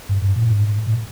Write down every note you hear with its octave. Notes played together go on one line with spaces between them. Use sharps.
G2
G2
A#2
G#2
A#2